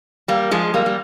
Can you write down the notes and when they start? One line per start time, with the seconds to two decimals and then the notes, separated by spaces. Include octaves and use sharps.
0.28 G3 A#3
0.51 F3 G#3
0.74 G3 A#3
0.86 G3